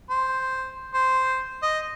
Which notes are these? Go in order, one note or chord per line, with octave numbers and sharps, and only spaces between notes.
C5
C5
D#5